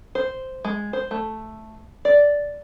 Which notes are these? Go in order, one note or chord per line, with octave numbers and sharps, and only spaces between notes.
C5
G#3
C5
A3
D5